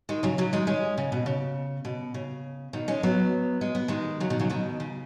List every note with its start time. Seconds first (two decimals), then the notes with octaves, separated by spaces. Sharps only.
0.09 D#3 G#3
0.23 C#3 F#3
0.38 C#3 F#3
0.53 D#3 G#3
0.67 G#3 C#4
0.98 C#3
1.12 B2
1.26 C#3
1.85 B2
2.14 C#3
2.73 B2 D#3
2.88 G#3 C#4
3.03 F#3 B3
3.61 G#3
3.75 B3
3.88 D#3 G#3
4.20 C#3 F#3
4.30 B2 D#3
4.39 C#3 F#3
4.50 B2 D#3
4.80 C#3